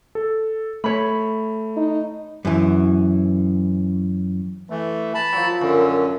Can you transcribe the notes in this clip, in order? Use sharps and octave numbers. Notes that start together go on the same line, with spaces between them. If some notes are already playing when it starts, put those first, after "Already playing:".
A4
A3 C#5 B5
D#4
F#2 E3
E3 A3
A5 B5
F3 F#3
F#2 D3 C#4